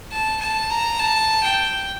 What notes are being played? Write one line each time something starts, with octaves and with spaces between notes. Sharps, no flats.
A5
A5
A#5
A5
G5